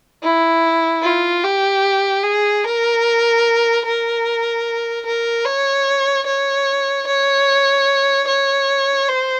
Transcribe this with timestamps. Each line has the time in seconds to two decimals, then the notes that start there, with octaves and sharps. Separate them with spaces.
0.23 E4
1.03 F4
1.44 G4
2.24 G#4
2.64 A#4
3.85 A#4
5.06 A#4
5.46 C#5
6.26 C#5
7.07 C#5
8.28 C#5
9.09 C5